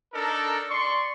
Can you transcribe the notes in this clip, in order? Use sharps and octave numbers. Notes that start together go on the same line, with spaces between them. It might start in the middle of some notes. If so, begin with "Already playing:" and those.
D4 D#4 A4 A#4
D5 C6 C#6